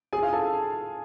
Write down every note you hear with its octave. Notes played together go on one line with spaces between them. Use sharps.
G#4 G#5
F4 F5
A4 A5